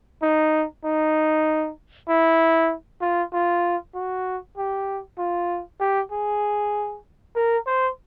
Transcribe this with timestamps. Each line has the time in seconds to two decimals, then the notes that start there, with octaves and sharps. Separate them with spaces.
0.22 D#4
0.85 D#4
2.09 E4
3.01 F4
3.33 F4
3.94 F#4
4.57 G4
5.18 F4
5.80 G4
6.12 G#4
7.36 A#4
7.67 C5